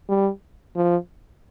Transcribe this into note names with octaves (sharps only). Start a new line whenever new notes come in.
G3
F3